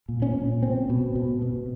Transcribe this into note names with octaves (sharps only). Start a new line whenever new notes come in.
A#2
C#4
A#2
B2 C4
B2
B2
B2